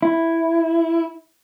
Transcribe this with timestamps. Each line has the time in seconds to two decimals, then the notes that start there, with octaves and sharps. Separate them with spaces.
0.03 E4